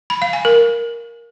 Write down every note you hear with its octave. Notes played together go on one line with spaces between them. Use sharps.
B5
F5
G#5
A#4